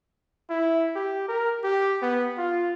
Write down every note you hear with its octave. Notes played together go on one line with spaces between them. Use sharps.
E4
G4
A#4
G4
B3
F4